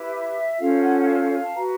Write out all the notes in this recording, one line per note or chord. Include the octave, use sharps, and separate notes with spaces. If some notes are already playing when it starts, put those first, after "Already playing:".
Already playing: E4 G4 B4
E5
C#4 F4 A4 C5 F5
F#5
F#5
F5
F5
A5
F#4 B4 A#5